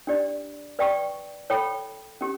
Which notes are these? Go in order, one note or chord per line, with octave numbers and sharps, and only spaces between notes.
D4 G4 D5
B4 D5 G5 C#6
A4 C#5 G5 B5
C#4 G4